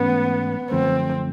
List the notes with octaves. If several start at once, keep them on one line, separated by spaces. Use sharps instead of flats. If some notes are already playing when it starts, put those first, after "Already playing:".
Already playing: G#2 E3 A3 B3 C#4
F#2 D3 F3 A3 C4